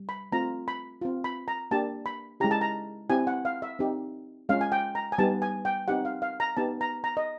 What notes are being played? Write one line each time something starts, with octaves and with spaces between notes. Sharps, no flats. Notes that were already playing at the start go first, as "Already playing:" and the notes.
Already playing: G3
B5
A3 C4 F4 A#5
B5
C4 F4
B5
A#5
A#3 D4 G4 A5
B5
G#3 C#4 E4 G4 A#5
A5
A#5
C4 E4 G4 G#5
F#5
F5
E5
C4 D#4 G4
G#3 C#4 F4 F5
G#5
G5
A#5
G#5
G3 B3 D#4 G4 A5
G#5
G5
C4 D#4 G4 F#5
F5
F5
A#5
B3 D#4 G4 A5
A#5
A#5
D#5